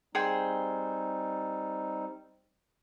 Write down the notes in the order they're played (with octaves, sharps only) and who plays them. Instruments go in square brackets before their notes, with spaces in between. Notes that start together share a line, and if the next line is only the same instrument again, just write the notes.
[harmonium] G3 C4 D#4 [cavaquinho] G#4 C5 G5